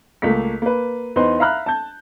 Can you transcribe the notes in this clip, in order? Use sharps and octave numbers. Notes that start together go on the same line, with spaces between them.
C#2 A3 A#3 B6
A#3 B4
E2 D#4 B4 C5 C6
E5 F5 A#5 B5 F6 F#6
A5 G6